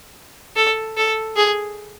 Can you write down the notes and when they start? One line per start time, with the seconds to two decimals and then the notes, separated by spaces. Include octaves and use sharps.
0.56 A4
0.97 A4
1.36 G#4